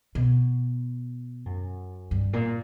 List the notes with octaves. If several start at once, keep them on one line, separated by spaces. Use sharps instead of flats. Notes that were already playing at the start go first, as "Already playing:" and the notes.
B2
F#2
G2
A#2